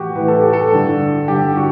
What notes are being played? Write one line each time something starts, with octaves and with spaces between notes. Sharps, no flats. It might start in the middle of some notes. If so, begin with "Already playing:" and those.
Already playing: A2 E3 F#4 G4
A2 E3 B4
A4
G4
A4
G2 D3
G2 D3 G4
F#4